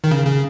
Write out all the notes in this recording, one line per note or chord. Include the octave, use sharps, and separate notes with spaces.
D#3
C#3
C#3